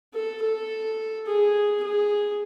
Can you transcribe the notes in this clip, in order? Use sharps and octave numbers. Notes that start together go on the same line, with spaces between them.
A4
A4
G#4
G#4